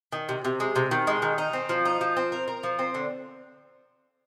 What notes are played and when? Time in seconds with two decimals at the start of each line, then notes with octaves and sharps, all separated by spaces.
0.12 D#3
0.29 C3
0.45 C3
0.60 G#3
0.76 C3
0.91 D#3
1.07 G#3
1.22 D#3
1.38 D#4
1.53 C4
1.69 F3
1.85 D#4
2.01 F3
2.17 C4
2.32 A#4
2.48 A#4
2.63 F3
2.79 C4
2.95 D3